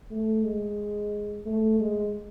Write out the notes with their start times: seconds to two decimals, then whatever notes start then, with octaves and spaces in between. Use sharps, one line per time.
0.11 A3
0.44 G#3
1.46 A3
1.80 G#3